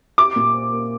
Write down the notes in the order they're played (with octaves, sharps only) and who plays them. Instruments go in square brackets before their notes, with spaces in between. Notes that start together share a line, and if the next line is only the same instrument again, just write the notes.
[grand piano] G4 [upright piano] D6
[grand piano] A#2
C5
A#3